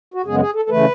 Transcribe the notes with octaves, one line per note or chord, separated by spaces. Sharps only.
F#4
F#2 C#3 G#3 B3 G#4
G#4
A4
A4
C#3 E3 A3 B4